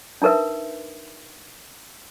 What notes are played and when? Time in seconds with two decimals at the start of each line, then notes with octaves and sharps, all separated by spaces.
0.22 D4 D#4 A#4 B4 E5